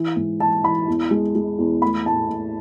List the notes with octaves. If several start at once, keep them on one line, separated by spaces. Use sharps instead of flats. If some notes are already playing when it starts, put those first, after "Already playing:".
Already playing: E3
G#2
E3 A5
E3 B5
E2
G#3
G#3
E2
A3 B5
A2 A5
A2